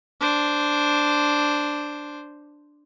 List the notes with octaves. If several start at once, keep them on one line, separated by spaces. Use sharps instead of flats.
D4 C5